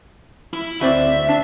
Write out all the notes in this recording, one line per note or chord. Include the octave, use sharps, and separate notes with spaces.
E4
D2 C4 D5 E5
D4